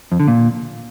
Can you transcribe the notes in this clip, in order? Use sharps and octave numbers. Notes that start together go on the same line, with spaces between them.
F2
D3
A#2